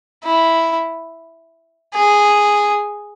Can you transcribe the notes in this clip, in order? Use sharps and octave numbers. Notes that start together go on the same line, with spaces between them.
E4
G#4